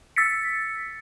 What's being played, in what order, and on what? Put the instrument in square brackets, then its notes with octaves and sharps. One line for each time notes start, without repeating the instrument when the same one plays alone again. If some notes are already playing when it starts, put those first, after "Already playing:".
[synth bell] E6 A6 B6 C#7